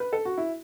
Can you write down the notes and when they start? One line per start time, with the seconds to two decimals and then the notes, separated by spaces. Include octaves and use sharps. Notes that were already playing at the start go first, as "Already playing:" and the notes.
0.00 B4
0.13 A4
0.25 F#4
0.38 E4